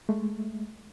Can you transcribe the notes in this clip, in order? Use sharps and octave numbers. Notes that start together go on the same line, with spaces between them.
G#3 A3